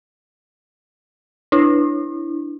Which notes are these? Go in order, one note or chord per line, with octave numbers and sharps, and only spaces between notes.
D4 E4